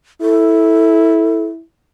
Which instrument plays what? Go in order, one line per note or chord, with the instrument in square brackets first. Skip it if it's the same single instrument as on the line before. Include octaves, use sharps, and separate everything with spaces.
[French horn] E4 [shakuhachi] A4